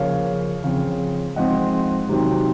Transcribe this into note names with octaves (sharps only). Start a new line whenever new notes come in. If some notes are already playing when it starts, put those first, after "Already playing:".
Already playing: C#3 F3 A#3 C#5 F5
C#3 F3 C4
G#2 F3 G#3 C4 D#5 F#5
C3 D#3 F#3 C4